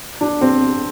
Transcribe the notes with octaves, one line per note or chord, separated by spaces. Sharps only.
D4
C4